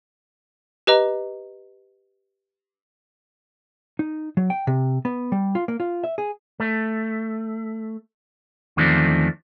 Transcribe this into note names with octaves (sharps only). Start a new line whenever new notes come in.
G4 B4 D#5 A#5
D#4
F#3
G5
C3
B3
G3
F4
A#3
F4
E5
G#4
A3
E2 D#3 F3 A3 C4 D4